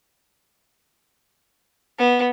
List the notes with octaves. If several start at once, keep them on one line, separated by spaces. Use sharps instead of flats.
B3